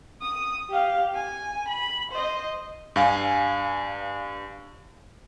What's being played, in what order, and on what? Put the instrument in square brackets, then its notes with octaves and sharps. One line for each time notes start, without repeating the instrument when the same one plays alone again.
[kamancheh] D#6
G4 F5
G#5
B5
C5 D#5
[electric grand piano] G2 F5 G#5